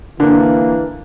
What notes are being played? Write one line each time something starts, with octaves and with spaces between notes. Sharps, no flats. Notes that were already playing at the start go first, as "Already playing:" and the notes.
D3 E3 A#3